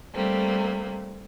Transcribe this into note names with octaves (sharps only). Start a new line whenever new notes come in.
G3 A3 A#3 C4